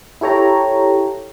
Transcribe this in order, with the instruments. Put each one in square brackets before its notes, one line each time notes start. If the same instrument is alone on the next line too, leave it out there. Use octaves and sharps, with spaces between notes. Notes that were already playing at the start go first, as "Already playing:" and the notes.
[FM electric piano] E4 G4 A4 C#5 G5 A#5